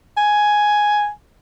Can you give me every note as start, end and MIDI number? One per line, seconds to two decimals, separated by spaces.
0.17 1.09 80